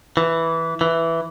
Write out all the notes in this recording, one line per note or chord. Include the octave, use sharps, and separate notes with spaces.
E3
E3